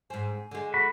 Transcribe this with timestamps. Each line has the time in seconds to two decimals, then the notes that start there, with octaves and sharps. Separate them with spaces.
0.10 G#2 C4 G#5
0.51 D3 G#3
0.74 F#4 B5